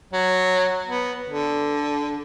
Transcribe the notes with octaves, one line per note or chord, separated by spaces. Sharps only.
F#3
B3
D3